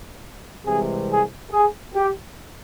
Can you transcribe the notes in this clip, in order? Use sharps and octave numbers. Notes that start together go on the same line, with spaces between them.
C2 C3 E3 G#3 G#4
G#4
G#4
G4